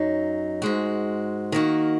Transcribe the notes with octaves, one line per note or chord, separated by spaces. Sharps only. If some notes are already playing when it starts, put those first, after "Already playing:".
Already playing: F#2 F#3 D#4
G#2 G#3 F#4
D#3 A#3 F#4